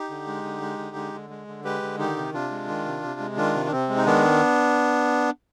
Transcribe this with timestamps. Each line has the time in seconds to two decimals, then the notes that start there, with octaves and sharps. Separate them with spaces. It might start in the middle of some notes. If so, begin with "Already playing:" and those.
Already playing: D#4 G4
0.10 D3
0.27 G#3
0.44 D3
0.62 G#3
0.79 D3
0.96 G#3
1.14 D3
1.30 G#3
1.48 D3
1.64 G#3 G4 B4
1.82 D3
1.99 D#3 D#4 G4
2.16 C3
2.33 C3 D4 F4
2.51 G#3
2.68 D#3
2.86 C3
3.03 C3
3.20 G#3
3.37 D#3 D4 F4
3.55 C3
3.66 D4
3.71 C3 C4
3.89 G#3
3.97 D#4
4.06 D#3 B3 D4